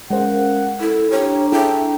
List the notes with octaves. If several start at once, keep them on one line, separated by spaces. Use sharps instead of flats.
G#3 C#4 A#4 C5 F5 F#5
E4 A4
D4 G4 C#5 A#5 C#6
E4 G#4 A4 G5